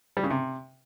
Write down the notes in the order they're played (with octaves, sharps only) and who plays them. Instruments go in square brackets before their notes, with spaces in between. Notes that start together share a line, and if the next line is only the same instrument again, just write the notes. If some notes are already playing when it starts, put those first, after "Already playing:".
[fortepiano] G3
C#3
C3